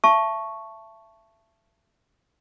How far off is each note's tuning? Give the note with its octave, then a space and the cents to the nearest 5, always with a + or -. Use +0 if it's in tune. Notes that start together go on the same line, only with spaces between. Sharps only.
E5 +30 A5 +0 C#6 +0